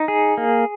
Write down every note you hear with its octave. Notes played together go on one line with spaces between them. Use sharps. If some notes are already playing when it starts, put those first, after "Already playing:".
Already playing: D#4
G#4
A#3